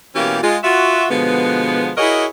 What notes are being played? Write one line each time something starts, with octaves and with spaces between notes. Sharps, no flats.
B2 E3 A#3 C#4 G4
G#3 F4
F4 F#4 E5
B2 D3 F3 G#3 B3
E4 F#4 G#4 A#4 C#5 D#5